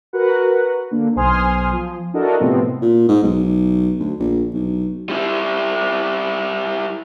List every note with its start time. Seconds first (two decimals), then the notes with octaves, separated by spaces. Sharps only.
0.13 F#4 A#4 B4 F#5
0.91 D3 A#3
1.16 B1 C5 G#5 C6 D#6 F6
1.71 F3
2.13 D4 E4 F#4 A4 A#4 D#5
2.40 A2 C3 F3 B3 C4
2.82 A#2
3.09 G#2
3.23 B1
4.00 D2
4.19 A#1
4.54 B1
5.09 G3 E4